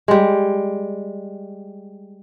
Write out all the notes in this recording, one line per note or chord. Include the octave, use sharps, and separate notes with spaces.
G3 G#3